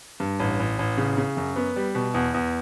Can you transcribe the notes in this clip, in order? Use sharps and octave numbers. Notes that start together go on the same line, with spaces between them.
G2
A1
A1
A1
C#3
C#3
F#2
B3
G3
B2
E2
E2